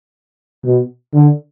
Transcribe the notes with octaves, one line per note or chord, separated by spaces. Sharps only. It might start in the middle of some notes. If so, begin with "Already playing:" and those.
B2
D3